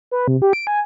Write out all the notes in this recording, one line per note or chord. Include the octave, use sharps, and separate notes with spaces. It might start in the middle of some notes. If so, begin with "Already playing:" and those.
B4
C3
G4
D7
G#5